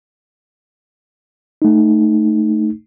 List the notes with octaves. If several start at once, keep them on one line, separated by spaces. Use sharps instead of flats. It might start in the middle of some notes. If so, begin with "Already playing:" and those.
A3 D#4